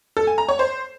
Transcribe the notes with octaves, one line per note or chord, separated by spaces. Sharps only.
A4
G#5
A#5
C#5
C5